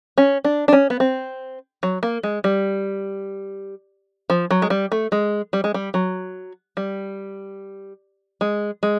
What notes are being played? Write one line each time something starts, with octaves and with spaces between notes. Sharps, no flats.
C#4
D4
D4
C#4
B3
C4
F#3
A#3
G#3
G3
F3
F#3
G#3
G3
A3
G#3
G3
G#3
G3
F#3
G3
G#3
G#3